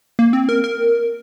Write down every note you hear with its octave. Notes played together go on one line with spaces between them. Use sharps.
A#3
C4
A#4
A#4